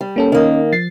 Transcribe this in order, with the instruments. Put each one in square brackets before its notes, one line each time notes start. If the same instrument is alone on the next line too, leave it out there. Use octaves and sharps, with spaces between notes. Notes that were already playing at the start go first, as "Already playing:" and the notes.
[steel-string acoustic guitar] G3
[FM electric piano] A#3 C#4 A4
[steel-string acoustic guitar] D#3 A#3 [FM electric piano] C#4 D#5
[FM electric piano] F3 A6 C7